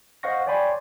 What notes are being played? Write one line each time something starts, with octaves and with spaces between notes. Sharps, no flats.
C5 D#5 F5 F#5 C#6 A#6
C#5 D5 G5 G#5 B5 C6